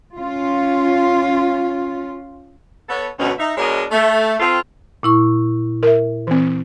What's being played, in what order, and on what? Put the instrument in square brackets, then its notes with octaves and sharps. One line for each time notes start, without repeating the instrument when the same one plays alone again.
[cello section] C#4 F4
[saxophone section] B3 A4 C#5
D2 B2 C#4
D#4 E5
B2 G#3 D4 A#4 C#5 D#5
A3
C4 F4 A4
[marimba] A#2 E4 C#6
[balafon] A#4 E5
E3 C4